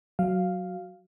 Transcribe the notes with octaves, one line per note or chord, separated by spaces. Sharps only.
F#3 F5